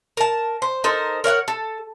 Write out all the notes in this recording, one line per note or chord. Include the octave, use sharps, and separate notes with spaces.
A#4 A5
C5
D#4 A4 A#4 C5
A#4 C#5 F5 F#5
A4